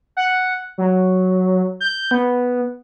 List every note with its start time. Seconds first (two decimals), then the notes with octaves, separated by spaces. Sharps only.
0.17 F#5
0.78 F#3
1.80 G6
2.11 B3